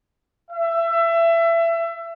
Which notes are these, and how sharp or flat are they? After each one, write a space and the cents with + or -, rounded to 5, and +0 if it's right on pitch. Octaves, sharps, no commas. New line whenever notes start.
E5 +25